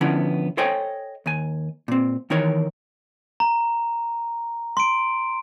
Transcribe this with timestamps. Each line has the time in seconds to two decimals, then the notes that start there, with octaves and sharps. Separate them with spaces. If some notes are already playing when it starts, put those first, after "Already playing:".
0.01 D3 F3 B3 C#4 E4
0.57 A4 C5 C#5 D#5 G5 G#5
1.26 D#2 G#5
1.88 A#2 C4
2.30 D#3 E3 D#4 A#4 C#5
3.40 A#5
4.77 C6 D7